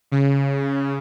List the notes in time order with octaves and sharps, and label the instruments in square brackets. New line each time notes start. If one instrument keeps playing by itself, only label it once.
[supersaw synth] C#3